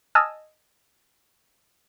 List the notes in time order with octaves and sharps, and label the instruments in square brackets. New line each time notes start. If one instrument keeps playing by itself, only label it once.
[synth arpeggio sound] D#5 G#5 A5 E6 F6